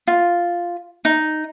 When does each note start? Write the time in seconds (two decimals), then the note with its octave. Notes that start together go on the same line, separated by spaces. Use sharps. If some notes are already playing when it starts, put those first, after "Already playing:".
0.08 F4
1.05 D#4